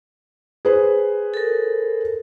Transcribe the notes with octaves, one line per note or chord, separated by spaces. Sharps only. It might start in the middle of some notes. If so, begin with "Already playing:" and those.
G#4 B4 C5
A4 A#4